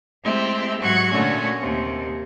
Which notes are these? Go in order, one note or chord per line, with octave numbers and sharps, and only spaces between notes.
G#3 A3 C4 E4 G4
G#2 F#3 F#4 C#6 F#6 G#6
A#2 D3 A3 C#4 F#4
D#2 C3